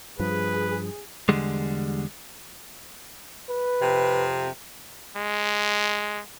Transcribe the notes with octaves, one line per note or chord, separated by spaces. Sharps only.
G2 F3 G#4 B4
E2 D3 G3 G#3
B4
F2 C3
G#3